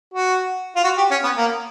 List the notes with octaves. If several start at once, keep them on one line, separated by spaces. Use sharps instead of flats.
F#4
F4
F#4
G4
C#4
B3
A#3